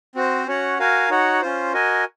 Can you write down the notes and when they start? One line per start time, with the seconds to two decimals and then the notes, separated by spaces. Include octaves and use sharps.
0.15 C4 F#4 C5
0.47 C#4 F#4 C#5 F#5
0.79 F#4 A#4 F5 G#5
1.10 D#4 F#4 C#5 F#5
1.41 C#4 F4 C5
1.73 F#4 A#4 D#5 G#5